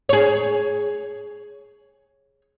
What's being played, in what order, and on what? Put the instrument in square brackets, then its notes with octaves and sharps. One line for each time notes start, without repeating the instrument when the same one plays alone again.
[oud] G#4 C#5